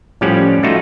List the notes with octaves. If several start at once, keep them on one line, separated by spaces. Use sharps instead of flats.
A2 F3 G3 C#4 G4 F#5
A3 D#4 F4 F#4